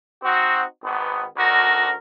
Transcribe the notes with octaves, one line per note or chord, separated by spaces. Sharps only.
C4 D#4 F#4
G#1 D#3 B3
D2 D3 D#3 F#4 A#4